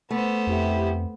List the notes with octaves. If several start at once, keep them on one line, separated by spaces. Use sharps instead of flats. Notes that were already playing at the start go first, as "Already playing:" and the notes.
A3 B3 C5
F2 E4 G4